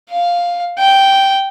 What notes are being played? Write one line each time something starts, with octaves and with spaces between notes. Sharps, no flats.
F5
G5